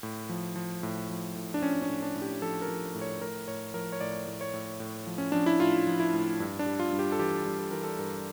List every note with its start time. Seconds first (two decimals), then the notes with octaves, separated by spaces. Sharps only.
0.03 A2
0.29 F3
0.56 F3
0.83 A2
1.09 F3
1.35 A2
1.54 D4
1.62 F3 C#4
1.82 C#4
1.89 A2
2.02 D4
2.15 A2
2.22 G4
2.42 F3 A4
2.62 A#4
2.68 F3
2.95 A2
3.01 C#5
3.21 A2 A#4
3.48 A2 C#5
3.74 F3 A#4
3.92 C#5
4.01 A2 D5
4.27 A2
4.41 C#5
4.54 A2
4.80 A2
5.07 F3
5.18 C#4
5.32 F3 D4
5.46 E4
5.60 A2 F4
5.87 F3
6.00 E4
6.13 A2
6.40 G2
6.59 D4
6.66 G3
6.80 F4
6.92 G2
6.99 G4
7.12 A4
7.19 E3 G4
7.46 G3
7.59 A4
7.71 E3 A#4
7.83 A4
7.99 G2 A#4